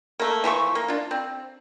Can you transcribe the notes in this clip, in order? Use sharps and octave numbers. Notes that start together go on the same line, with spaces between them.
A3 A#3
E3 F3 E5 C#6
A#3
D4 F4
C4